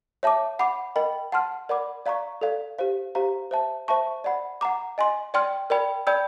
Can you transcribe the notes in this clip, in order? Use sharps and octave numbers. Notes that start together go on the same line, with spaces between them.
C#5 E5 A5 D6
F#5 B5 D6
A#4 D#5 G5 B5
F#5 A5 C6 F6
A#4 D5 F#5 B5 D6
D5 F5 A#5 C#6
A4 D5 F5
G4 C5 F5
G4 C5 F5 A#5
C5 E5 A5
C5 E5 A5 C#6
D5 F#5 B5
F#5 A#5 D6
D#5 G#5 C6
D5 G5 C6 F6
A#4 D5 G5 B5
D5 G5 B5 E6 G6